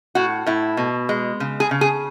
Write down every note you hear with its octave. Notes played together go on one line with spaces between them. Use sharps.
A2 F#4
A2 E4
B2
G#3
C#3
G#4
C#3
G#4